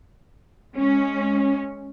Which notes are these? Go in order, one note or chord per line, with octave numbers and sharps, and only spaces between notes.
G#3 C#4